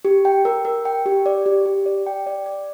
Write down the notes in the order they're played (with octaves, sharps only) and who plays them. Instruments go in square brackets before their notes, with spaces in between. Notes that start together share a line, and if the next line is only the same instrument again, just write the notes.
[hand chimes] G4
G5
A#4
A#4
G5
G4
D5
G4
G4
D5
G5
D5
D5